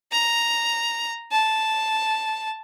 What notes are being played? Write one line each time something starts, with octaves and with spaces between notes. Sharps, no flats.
A#5
A5